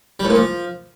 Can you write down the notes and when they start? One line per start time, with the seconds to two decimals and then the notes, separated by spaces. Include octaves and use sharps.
0.20 G3
0.25 A2
0.30 A#2
0.35 F3